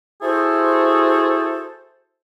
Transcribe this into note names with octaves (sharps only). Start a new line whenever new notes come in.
E4 F#4 G#4 A4 C5